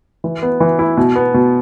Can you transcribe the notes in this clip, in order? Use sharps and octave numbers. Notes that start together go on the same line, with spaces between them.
E3
B3
E3
E4
B2
B3
B2